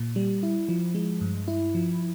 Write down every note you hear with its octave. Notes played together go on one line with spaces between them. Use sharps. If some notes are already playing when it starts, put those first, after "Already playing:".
Already playing: A#2
G3
E4
F3
G#3
G2
E4
F3